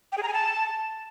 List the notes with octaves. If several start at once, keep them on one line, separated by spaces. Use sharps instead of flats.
G5
G#4
A#5
G#5
A5